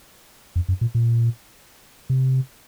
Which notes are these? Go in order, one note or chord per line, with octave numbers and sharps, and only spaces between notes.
F2
F#2
A#2
A#2
C3